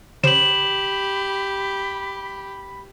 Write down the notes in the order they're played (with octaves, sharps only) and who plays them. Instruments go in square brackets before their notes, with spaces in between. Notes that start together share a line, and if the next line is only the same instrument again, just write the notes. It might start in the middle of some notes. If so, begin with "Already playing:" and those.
[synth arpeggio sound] C#3 C5 [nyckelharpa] G4 [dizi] B5 [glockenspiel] E7 F#7